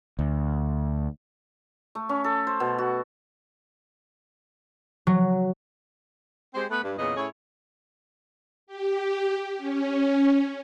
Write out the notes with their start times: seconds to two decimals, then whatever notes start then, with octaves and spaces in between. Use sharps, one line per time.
0.19 D2
1.95 A3
2.09 C#4
2.24 A4
2.47 C5
2.60 B2
2.78 F#4
5.07 F#3
6.54 G#3 C4 G4 C5
6.71 A3 B3 B4
6.83 G2
6.98 E2 A#2 C#3 B3 G#4 D#5
7.16 A2 C#4 E4 G#4 C#5
8.67 G4
9.57 C#4